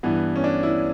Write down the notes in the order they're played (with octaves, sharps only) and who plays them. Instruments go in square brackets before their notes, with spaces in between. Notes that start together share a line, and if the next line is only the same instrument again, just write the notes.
[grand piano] G2 E3 B3
C#4
D4
E4